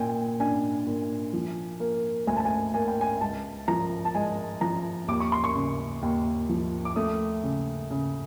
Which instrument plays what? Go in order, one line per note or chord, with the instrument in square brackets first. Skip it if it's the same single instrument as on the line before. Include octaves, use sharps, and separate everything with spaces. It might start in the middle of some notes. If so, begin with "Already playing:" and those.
Already playing: [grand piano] A#2 G5 G#5
D4 G#5
A#2
F3
A#3
D2 G#5
A5
G#5
A#3 G#5
G5
G#5
C#2 A5
F3 A#5
A5
G#3 G#5
F3 A#5
D#2 D6
C#6
C6
C#6
C#3
D#2
F3
D6
A3 D#6
C#3
C#3